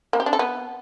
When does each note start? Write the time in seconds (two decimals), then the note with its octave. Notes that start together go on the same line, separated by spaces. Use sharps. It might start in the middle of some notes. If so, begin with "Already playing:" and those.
0.13 A#3
0.20 G4
0.26 D4
0.33 A4
0.39 B3